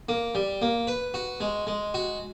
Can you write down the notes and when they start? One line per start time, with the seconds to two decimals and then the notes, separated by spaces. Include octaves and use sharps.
0.09 A#3
0.35 G3
0.62 A#3
0.87 B4
1.14 F#4
1.40 G#3
1.67 G#3
1.94 F#4